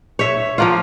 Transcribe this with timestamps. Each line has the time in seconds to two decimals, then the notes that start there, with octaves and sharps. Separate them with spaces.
0.19 C#5 E5
0.58 F3 A#3 F4